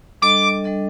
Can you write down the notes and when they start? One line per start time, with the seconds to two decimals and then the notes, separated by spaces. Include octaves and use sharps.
0.22 G3 D4 A4 D#5 D6
0.64 G3 D4 A4 D#5